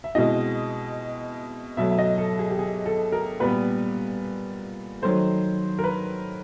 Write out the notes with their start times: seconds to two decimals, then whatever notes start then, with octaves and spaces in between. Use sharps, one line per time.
0.04 E5
0.15 B2 G#3 C4 E4 D#5
1.77 B2 F#3 A3 E5
1.91 E5
1.98 D#5
2.18 A4
2.39 G#4
2.50 G4
2.59 G#4
2.86 A4
3.12 A#4
3.40 A#2 G3 B3 B4
5.02 D#3 F#3 A3 C5
5.79 A#4
5.84 B4